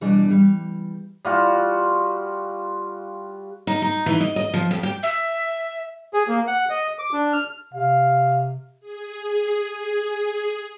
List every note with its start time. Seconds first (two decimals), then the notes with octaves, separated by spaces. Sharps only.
0.01 B2 E3 G3 D4 D5
0.28 E3 G3
1.25 G3 F4 F#4
3.67 D#4
3.82 D#4
4.06 E3
4.20 D#5
4.36 D#5
4.54 F3
4.71 F2
4.83 G4
5.03 E5
6.14 G#4
6.28 A#3
6.47 F#5
6.70 D#5
6.99 D6
7.13 D4
7.33 F6
7.74 C3 F5
8.80 G#4
9.64 G#4